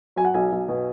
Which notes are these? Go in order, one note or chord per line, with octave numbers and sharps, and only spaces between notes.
F#3 G#5
F#5
B1 G#5
B1
B2